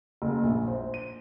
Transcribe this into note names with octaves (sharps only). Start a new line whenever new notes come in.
F#1
A#1
C5
D#7